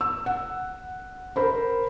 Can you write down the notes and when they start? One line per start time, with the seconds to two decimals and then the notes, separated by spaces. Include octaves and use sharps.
0.01 E6
0.26 F#5
1.36 A#4 C5 B5